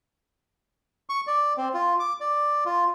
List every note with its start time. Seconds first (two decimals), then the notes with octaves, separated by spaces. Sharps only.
1.09 C#6
1.27 D5
1.57 C4
1.74 F4
2.00 D6
2.20 D5
2.66 F4